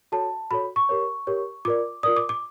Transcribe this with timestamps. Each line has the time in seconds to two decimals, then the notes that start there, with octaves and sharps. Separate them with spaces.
0.12 F#4 A4 C#5 A5
0.51 F#4 A4 C#5 B5
0.76 C#6
0.89 G4 A#4 C#5
1.27 G4 A#4 C#5
1.65 F4 A#4 D5 D6
2.03 F4 A#4 D5 D#6
2.16 D6
2.29 D6